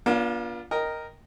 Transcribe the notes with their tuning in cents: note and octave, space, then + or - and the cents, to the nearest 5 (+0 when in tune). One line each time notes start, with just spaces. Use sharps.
A#3 +45 D4 -25 F4 +0
A#4 +0 D#5 +0 G5 +0